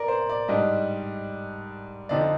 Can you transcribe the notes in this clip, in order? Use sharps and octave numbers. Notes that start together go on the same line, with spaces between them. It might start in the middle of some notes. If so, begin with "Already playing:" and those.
Already playing: A#4 D5
C5
D5
G#2 G3 D4 D#5
F2 D3 F3 C4 D#4 D5